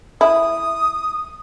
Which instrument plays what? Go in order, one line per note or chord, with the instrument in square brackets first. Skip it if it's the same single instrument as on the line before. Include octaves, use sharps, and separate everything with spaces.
[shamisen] E4 [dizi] D#6